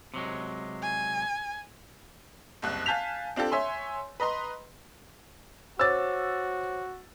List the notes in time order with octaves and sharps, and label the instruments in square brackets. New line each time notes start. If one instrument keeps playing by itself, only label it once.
[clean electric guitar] C3 F#3 G#3
[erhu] G#5
[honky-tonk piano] F#1 C2 F#6
F5 G#5 A5 G6 B6 F7
C4 D4 F4 G4 A4
C#5 E5 G#5 C6
B4 D#5 A#5 C6
[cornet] F#4 [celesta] C5 C#5 D6 [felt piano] E6 A6